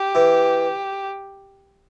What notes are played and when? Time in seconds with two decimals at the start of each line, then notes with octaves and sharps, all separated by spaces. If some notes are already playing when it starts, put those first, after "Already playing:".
Already playing: G4
0.15 E3